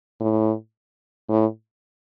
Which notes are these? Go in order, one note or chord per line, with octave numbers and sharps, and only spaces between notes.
A2
A2